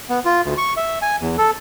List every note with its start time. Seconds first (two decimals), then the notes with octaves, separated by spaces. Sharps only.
0.09 B3
0.25 F4
0.44 D2
0.58 C#6
0.77 E5
1.02 G#5
1.21 E2
1.38 A4